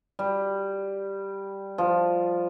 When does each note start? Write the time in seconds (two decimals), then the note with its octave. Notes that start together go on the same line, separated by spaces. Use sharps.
0.19 G3
1.78 F3